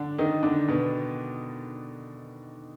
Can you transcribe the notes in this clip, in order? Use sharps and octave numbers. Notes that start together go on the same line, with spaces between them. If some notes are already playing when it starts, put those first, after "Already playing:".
Already playing: D3 D4
D#3 D#4
D3 D4
B2 B3